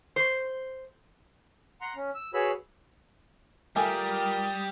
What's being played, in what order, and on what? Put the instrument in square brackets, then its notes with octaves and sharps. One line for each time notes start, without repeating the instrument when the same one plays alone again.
[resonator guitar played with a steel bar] C5
[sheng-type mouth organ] F#5 A#5 C6
C#4
E6
F#4 G#4 B4 C#5 B5 E6
[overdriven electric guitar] G3 [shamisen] A3 G5 G#5 [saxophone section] F4 G4 A#4 [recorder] D#6